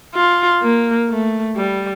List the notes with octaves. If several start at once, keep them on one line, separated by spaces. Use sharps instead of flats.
F4
A#3
A3
G3